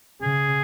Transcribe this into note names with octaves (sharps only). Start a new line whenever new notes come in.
C#3 G#4